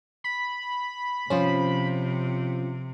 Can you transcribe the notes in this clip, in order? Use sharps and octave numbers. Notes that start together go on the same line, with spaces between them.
B5
C3 F3 C#4 F4 C5